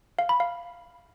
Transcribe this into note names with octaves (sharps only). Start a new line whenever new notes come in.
F5
B5
F5